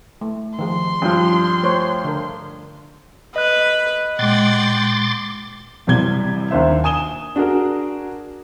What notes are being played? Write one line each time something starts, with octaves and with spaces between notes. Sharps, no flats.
A3
D#3 F3 G#4 C6
G2 F3 C#4
A3 C5 C#5
D3 A#4
B4 D#5 F#6
A#2 G#3 F#5 G5 C6 D6 A6
A1 F#2 C3 G3 G#6 G7
D#2 D4 C5 E5
G#5 D#6 E7 G7
D4 F#4 G#4 A#4